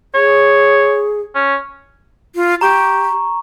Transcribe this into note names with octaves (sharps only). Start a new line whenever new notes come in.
G#4 C#5
C#4
F4
G4 A#5 C#6